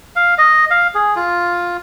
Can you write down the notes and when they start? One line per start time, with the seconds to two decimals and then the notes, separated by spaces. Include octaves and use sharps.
0.16 F5
0.38 D#5
0.71 F5
0.95 G#4
1.16 F4